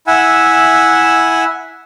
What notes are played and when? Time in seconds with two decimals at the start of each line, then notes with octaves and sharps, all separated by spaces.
0.07 E4 E5 F#5 G#5 E6